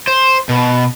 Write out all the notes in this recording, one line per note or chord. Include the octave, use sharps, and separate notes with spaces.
C5
B2